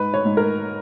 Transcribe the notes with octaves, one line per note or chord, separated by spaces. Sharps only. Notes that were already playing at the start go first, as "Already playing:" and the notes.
Already playing: G#2 B4
C#5
G#2
A#4